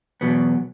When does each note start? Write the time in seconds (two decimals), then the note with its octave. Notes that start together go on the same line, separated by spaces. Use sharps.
0.21 E2 B2 F#3 B3